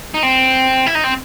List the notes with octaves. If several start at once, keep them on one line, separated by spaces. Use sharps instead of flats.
D#4
C4
E4
D#4
C4